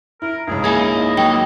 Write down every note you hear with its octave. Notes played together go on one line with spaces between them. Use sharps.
E4 A#4
C#2 G#2 C#3 G#4
A#3 D#4 E4 G#4 D#5 G#5
F#3 A#3 D#4 G5